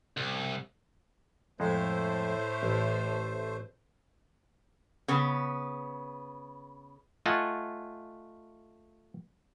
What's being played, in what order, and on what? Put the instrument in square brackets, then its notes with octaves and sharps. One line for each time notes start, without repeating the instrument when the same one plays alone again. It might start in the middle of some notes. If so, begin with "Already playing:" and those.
[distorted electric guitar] C2
[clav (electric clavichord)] F2 G#3 [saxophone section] A2 [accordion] A3 C5
[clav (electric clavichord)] A1
[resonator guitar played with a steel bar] C#3 B3
[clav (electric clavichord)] A3 F4 D#5 F#5 G#5 A5